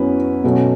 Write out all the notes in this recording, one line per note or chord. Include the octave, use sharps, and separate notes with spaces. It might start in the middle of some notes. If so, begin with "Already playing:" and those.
Already playing: F#2 F#3 B3 C#4 E4 B4
B2 F#3 A3 C#4